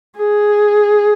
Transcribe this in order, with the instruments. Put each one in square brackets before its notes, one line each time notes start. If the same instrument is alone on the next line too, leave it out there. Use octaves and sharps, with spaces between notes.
[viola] G#4